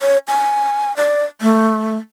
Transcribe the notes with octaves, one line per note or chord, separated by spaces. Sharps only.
C#5
G#5
D5
A3